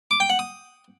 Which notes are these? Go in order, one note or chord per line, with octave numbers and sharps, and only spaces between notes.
D6
G5
F#5
D#6